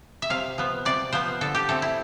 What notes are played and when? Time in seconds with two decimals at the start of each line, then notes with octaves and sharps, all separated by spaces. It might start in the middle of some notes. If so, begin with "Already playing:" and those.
0.22 E5
0.30 C3 F5
0.58 F3 B3
0.85 C3 D5
1.12 F3 B3 C5
1.41 D3 A4
1.55 G4
1.69 A3 C4 A4
1.82 E4